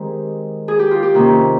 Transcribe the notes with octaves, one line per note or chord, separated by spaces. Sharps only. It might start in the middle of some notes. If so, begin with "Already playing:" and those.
Already playing: D#3 G#3 C4 G4
G#4
G4
F4
G4
C3 D#3 A#3 C#4